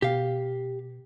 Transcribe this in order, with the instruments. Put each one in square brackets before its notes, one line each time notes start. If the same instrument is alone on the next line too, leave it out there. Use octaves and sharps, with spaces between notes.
[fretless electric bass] B2 [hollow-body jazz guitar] G4 F5